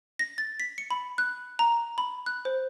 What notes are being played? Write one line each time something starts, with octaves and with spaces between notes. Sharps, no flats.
A#6
A6
B6
C#7
B5
F#6
A#5
B5
F#6
C5